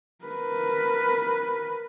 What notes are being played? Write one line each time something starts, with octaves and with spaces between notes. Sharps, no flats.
A#4 B4